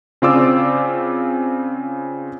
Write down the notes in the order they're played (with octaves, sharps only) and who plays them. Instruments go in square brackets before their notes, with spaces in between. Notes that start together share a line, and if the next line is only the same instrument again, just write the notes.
[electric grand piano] C#3 C4 F4 D5 D6 E6